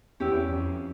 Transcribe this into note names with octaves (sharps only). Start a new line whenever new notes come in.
E2 C#4 E4 G4
F2